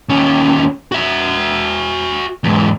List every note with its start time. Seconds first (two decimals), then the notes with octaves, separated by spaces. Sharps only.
0.09 D#2 C#4
0.92 F#4 E5
2.44 E2 G#2